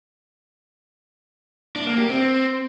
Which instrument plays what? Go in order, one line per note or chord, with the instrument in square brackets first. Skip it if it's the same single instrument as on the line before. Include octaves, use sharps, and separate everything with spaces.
[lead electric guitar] D4
A#3
G4
C4